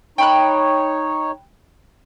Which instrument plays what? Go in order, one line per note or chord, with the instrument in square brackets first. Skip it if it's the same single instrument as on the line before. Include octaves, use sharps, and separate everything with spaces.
[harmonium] D#4 C#5 [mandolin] G5 B5 F#6